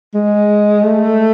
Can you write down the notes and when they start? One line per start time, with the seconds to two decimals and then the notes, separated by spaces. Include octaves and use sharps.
0.14 G#3
0.83 A3